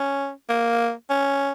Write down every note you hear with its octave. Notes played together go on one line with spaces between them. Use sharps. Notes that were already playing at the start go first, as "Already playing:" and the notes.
Already playing: C#4
A#3
C#4